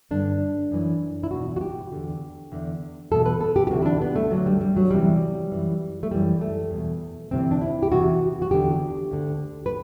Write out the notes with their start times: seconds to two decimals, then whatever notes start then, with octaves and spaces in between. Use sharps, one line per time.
0.11 G2 D3 D4
0.71 F#2 E3
1.23 E4
1.31 E2 B2 F#4
1.56 F#4
1.61 G4
1.92 E2 D3
2.52 E2 D3
3.11 E2 B2 A4
3.26 B4
3.41 A4
3.56 G4
3.67 G4
3.71 D2 C3 E3 F#4
3.82 E4
3.86 D4
4.01 B3
4.16 A3
4.31 D2 D3 F#3
4.46 G3
4.61 G3
4.77 F#3
4.91 E2 C3 E3 G3
5.52 F#2 E3
6.03 A3
6.11 F#2 E3 G3
6.41 A3
6.71 E2 B2
7.31 D2 C3 E3 C4
7.51 D4
7.61 E4
7.83 G4
7.91 E2 C3 E3 F#4
8.42 F#4
8.51 E2 D3 G4
9.11 D2 D3
9.66 B4